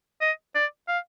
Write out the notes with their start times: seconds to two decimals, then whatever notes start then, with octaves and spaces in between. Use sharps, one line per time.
0.21 D#5
0.55 D5
0.88 F5